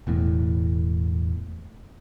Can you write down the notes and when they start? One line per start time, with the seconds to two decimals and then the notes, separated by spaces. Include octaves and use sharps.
0.07 E1 E2 A2